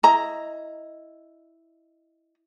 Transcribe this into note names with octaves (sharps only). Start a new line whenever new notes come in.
E4 D#5 A#5